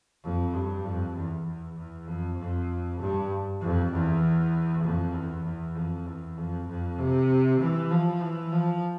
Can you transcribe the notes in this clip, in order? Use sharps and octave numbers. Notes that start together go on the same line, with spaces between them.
F2
G2
F2
E2
E2
E2
F2
F2
G2
F2
E2
F2
E2
E2
F2
E2
F2
F2
C3
E3
F3
E3
F3